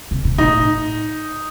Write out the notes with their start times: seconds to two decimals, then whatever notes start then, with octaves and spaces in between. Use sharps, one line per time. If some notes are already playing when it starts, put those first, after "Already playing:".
0.11 C3
0.25 B2
0.38 A2 D#4